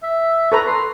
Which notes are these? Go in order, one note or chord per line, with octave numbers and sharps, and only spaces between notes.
E5
A4 B4 A#5 C#6
C6